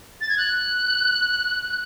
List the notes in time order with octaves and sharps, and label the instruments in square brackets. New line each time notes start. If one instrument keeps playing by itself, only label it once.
[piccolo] A6
G#6
F#6